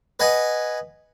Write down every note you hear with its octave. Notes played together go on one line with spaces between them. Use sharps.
B4 D#5 F#5 G#5